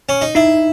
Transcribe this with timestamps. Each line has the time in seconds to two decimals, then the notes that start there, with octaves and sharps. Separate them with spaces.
0.09 C#4
0.21 D#4
0.35 D#4 E4